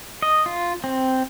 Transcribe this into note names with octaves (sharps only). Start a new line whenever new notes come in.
D#5
F4
C4